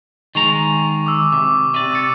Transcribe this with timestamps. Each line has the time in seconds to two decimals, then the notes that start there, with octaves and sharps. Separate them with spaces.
0.35 D#3 G#3 A#5 C#6
1.06 D6 E6
1.32 C3 D6
1.74 C3 D5 D#7
1.92 D6 A6 C#7